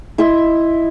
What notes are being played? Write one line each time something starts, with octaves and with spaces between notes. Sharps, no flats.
E4 D#5 E5 C6